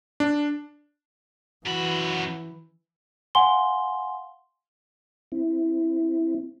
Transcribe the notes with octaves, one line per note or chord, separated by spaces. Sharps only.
D4
F#2 E3 F#4 B5
F5 F#5 G#5 C6 G7
C4 E4